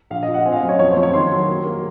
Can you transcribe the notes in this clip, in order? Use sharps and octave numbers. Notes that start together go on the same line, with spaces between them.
A#1 F5
D#5
F3
F#5
C4 G#5
F5
D#5
F#2
C#5
F2 C#5
C5
F2
C#5
D#3 C6
F#3
A#3
A#3